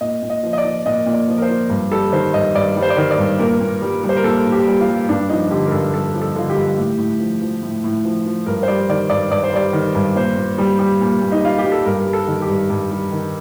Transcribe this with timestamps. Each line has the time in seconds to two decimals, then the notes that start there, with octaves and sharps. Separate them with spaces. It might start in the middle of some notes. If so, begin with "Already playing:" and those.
0.01 A#2 D#5
0.23 A#2
0.30 D#5
0.43 F3
0.53 D#5
0.58 D5
0.65 F3
0.86 A#2 D#5
1.06 A#2
1.13 D5
1.28 F3
1.38 A#4
1.42 C5
1.49 F3
1.70 G2
1.91 G3 A4
2.12 D#3 C5
2.34 G2 D#5
2.55 G2 D5
2.76 G3
2.82 C5
2.90 D5
2.97 D#3 C5
3.11 D5
3.18 G2
3.39 A#2 A#4
3.60 A#2
3.82 G3
4.03 G3
4.09 C5
4.17 A#4
4.24 A#2 A4
4.46 A#2
4.52 G4
4.67 G3
4.81 F4
4.87 G3
5.09 G2 D4
5.29 F3 D#4
5.50 D3 G4
5.66 A#4
5.72 G2 A4
5.93 G2 A4
6.14 F3
6.21 A4
6.36 D3 F4
6.49 G4
6.56 G2
6.78 A2
6.98 A2
7.20 F3
7.41 F3
7.63 A2
7.84 A2
8.05 F3
8.26 F3
8.46 G2 A#4
8.63 C5
8.68 G3 D5
8.89 D#3 D5
9.10 G2 D5
9.31 G2 D5
9.44 C5
9.53 G3 D5
9.73 D#3
9.95 G2
10.15 A#2 C5
10.37 A#2
10.58 G3
10.79 G3
11.01 A#2
11.22 A#2
11.32 D#4
11.43 G3 F4
11.58 G4
11.65 G3
11.72 A4
11.85 G2 A#4
12.06 G3
12.13 A4
12.28 D#3
12.42 G4
12.48 G2
12.70 G2
12.91 G3
13.12 D#3